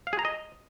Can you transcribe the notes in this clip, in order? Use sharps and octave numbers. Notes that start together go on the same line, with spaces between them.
F5
G#4
A#5
D#5